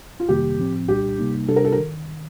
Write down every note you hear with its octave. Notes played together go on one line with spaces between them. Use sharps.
F4
F2 C3 D#3 G3 A#3 G4
A2 F3 C4
C2 A#2 G3 D4 G4
C3 G3 A#3 D#4
C3 G3 D4 G4 A4
A#4
A4
A#4
D#3